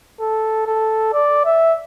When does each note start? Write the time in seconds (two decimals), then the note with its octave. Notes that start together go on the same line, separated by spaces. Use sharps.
0.20 A4
0.67 A4
1.13 D5
1.45 E5